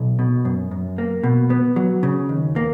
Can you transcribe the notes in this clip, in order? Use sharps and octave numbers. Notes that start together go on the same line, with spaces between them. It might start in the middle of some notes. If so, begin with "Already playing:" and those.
Already playing: B1
B2
F#2
F#2
A#3
B2
B3
F#3
C#3
D#2
A#3